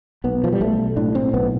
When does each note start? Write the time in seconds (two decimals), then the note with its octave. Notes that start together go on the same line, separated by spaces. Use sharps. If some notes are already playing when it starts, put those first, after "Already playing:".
0.24 B1 B3
0.44 F3
0.53 G3
0.60 B1 A3
0.97 A2 D4
1.15 C4
1.34 B1 B3